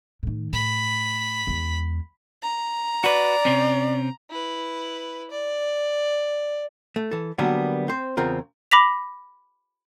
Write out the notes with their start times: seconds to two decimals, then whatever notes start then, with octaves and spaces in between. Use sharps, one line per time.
0.23 A2 D#3
0.53 A2 B5
1.47 E2 G#3
2.43 A#5
3.04 F#4 B4 D5
3.45 C3 C4 C#4
4.30 E4 B4
5.31 D5
6.96 A3
7.11 E3 A4
7.38 D3 F#3 G3 A#3 B3
7.88 C4 C5
8.17 E2 C#3 C4 F4 A#4
8.71 B5 D6 A#6 B6 F7